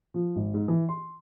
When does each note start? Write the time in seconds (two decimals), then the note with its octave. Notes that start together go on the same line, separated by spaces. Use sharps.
0.14 F3
0.36 G#1
0.54 G#2
0.68 E3
0.89 C6